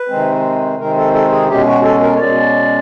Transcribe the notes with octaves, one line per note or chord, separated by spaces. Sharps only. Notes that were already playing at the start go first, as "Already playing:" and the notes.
Already playing: B4
C3 D#3 G#3 C4
C3 D#3 G#3 C4 A#4
A4
A4
G#4
B2 G#3 C#4 G4
F#4
A4
A#4
C#5
B2 G#3 C#4 D5